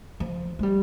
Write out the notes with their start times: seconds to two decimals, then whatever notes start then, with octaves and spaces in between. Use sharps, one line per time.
0.20 F3
0.59 G#3
0.63 G3